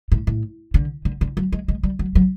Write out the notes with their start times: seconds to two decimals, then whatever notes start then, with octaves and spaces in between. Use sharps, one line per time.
0.12 A2
0.27 A2
0.74 D3
1.05 D3
1.21 D3
1.37 F#3
1.52 G#3
1.68 G#3
1.83 G3
1.99 F#3
2.15 F#3